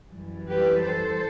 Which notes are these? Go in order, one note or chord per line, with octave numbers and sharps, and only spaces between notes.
F#2 E3 G3
G4 B4
A4 C5